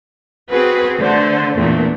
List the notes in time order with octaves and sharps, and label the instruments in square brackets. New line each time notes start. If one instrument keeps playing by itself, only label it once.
[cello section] C4 F#4 G#4 [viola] B4
[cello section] D3 [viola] A3 C5
[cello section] E2 A#2 [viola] A3 D4